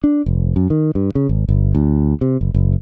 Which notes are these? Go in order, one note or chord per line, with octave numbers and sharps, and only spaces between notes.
D4
F1
F#2
D#3
G2
C#3
G#1
G1
D2
C3
F#1
F#1